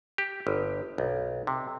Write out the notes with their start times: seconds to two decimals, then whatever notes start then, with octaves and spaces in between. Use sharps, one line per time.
0.18 G4
0.47 G1
0.98 B1
1.47 C3